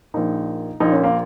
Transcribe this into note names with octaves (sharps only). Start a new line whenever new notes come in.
A#1 A#2 D#4
A#1 A#2 D#4
C#4
A#3